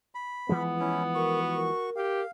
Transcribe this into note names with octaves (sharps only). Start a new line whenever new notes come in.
B5
E3 F3 G#3 B3
C#4 E4
F#4 A#4 C#6
A#4
G4 F5